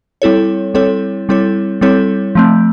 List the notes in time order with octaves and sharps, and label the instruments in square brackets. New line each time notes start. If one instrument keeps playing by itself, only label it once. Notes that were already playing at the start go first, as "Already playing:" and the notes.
[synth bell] G3 C4 E4 A4 C#5
G3 C4 E4 A4 C#5
G3 C4 E4 A4 C#5
G3 C4 E4 A4 C#5
F3 A3 C4